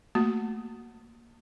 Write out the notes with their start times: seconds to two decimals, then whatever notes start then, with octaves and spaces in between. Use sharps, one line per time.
0.15 A3 A#3 F#4